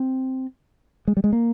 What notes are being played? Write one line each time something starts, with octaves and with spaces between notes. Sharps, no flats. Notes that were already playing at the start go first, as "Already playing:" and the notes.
Already playing: C4
G#3
G3
G#3
A#3